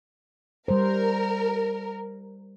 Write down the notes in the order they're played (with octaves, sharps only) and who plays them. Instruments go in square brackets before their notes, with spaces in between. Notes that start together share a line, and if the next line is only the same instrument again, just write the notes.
[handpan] G3 C5 [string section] A#4